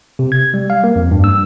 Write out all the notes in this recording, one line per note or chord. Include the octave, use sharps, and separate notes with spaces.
C3
G#6
G3
F5
A#3
F2
G2
E6